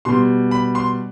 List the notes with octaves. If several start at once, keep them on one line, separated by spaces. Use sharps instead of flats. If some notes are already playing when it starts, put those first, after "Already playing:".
B2 G3 C6
B5
C6